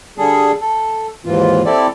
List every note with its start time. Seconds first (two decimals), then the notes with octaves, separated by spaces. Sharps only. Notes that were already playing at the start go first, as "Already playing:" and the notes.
0.18 D3 G3 G#4 A4
0.61 A4
1.25 D#2 G#2 E3 F4
1.66 C4 E4 G4 A4 D5